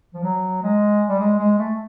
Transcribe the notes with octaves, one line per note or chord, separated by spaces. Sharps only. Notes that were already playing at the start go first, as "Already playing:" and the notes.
F3
F#3
G#3
G3
G#3
G#3
A3